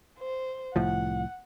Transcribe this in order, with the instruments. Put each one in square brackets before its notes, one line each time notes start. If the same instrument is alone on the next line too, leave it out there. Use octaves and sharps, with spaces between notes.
[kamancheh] C5
[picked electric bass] C2 A2 F3 [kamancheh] F#5